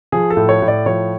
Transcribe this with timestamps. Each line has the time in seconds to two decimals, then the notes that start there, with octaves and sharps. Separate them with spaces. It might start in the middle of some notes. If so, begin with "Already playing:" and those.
0.12 F3 G#4
0.30 A4
0.37 A2
0.49 C#5
0.62 A2
0.68 D5
0.86 F3 C#5